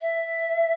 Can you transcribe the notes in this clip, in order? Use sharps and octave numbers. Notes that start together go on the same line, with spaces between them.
E5